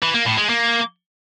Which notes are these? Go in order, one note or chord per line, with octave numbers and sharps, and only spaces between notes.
E3
A#3
A2
G#3
A#3